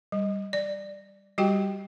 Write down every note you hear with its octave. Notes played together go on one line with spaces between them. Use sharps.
G3
D5
G3 F#4 G4 G5